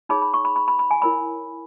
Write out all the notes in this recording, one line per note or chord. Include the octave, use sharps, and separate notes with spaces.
D#4 G#4 C#5 B5
B5
C#6
B5
B5
B5
B5
G#5
E4 A#4 C#5 B5